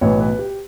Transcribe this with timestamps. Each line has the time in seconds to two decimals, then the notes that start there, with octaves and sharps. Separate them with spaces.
0.01 B1 A2 E3 C#5
0.20 B4
0.39 G4